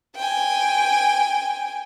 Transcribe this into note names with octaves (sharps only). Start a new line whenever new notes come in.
G5 G#5